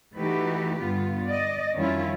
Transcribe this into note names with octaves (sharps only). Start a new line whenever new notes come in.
E3 A3 D#4 F#4 G4 B4
G2 D3 B3 F4
D5 D#5
F2 D#3 G3 C#4 E4 F4